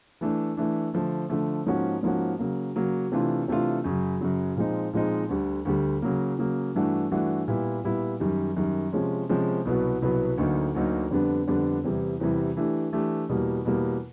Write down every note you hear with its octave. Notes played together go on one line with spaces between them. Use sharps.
E3 A3 D4
E3 A3 D4
D3 F3 A3
D3 F3 A3
G#2 F3 A#3 C#4 F#4
G#2 F3 A#3 C#4 F#4
C#3 F#3 A#3
C#3 F#3 A#3
C3 E3 A3 D4 F4
C3 E3 A3 D4 F4
F#2 C#3 F#3
F#2 C#3 F#3
A#2 F3 G#3 C4 D#4
A#2 F3 G#3 C4 D#4
D2 D3 G3
D2 D3 G3
C#3 F#3 A#3
C#3 F#3 A#3
G2 E3 A3 D4 F#4
G2 E3 A3 D4 F#4
A#2 G3 B3 E4
A#2 G3 B3 E4
F#2 D#3 G3
F#2 D#3 G3
C3 F3 G#3 C#4
C3 F3 G#3 C#4
C2 B2 F#3 B3
C2 B2 F#3 B3
D2 D3 F#3 A#3 D#4
D2 D3 F#3 A#3 D#4
F2 D3 G3 B3 D4
F2 D3 G3 B3 D4
E2 C3 E3 G3
E2 C3 E3 G3
E3 A3 D4 G4
E3 A3 D4 G4
E2 B2 G3 A#3
E2 B2 G3 A#3